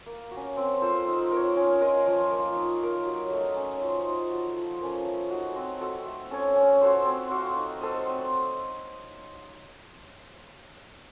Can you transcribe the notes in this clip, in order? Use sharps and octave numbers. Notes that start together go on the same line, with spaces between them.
A#3
F#4
C#4
C4
F4 A4 C5
D#4
A#4
C#5
C#4
F4 A#4 D#5
F3
A#3 F4
D#4
A#4 F5
F#3
A3 D#4
C#4
F4 C5
D#4
F#4 A4
F3
A#3 C#4 A4
A3
D#4 F#4
C4
F#4 A4
A3
C#4 A4 C#5
C#4
F#4 A4 C5
C4
F#4 C5 F5
D#4
A4 C5 D#5
C4